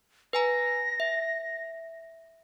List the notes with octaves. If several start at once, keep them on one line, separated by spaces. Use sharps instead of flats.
B4 G#5 A#5 A#6
E5